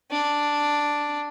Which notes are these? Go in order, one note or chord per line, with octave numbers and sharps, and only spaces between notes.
D4